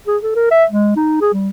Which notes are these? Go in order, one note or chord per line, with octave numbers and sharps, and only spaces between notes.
G#4
A4
A#4
E5
G#3
D#4
G#4
G3